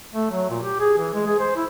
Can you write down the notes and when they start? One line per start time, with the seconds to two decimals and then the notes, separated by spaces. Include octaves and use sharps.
0.13 A3
0.31 F#3
0.50 A#2
0.63 G4
0.80 G#4
0.98 E3
1.14 G#3
1.27 G#4
1.39 C5
1.56 E4